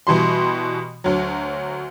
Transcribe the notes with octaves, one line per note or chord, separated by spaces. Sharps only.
B2 E3 G3 C6
D2 F#3